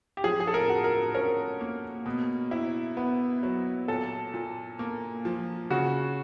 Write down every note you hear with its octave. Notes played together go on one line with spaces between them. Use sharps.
G4
F3 G#4
G#4
A4
A#4
F#4
A#4
C#4 A#4
A#3
B2
E4
B3
F#3
A#2 A4
A#2
A#3
F3
C#3 F#4